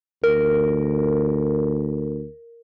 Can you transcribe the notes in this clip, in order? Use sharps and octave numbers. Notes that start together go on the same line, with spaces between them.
D2 A#4